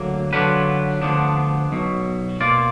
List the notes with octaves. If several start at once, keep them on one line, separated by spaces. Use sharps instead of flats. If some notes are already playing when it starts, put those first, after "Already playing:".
Already playing: D2 D3 F#3 A#3
D3 F#3 D4 F4 B4
D2 D3 F3 B3 D4
B1 B2 F#3
B2 A#3 F4 D5